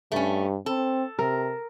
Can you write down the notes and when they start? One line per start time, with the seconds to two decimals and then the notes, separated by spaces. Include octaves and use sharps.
0.12 G2 A3 C#4
0.66 C4 A4
1.19 C3 A#4